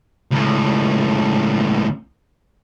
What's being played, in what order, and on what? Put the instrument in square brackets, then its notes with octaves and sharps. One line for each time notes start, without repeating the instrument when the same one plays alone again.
[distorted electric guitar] C#2 A2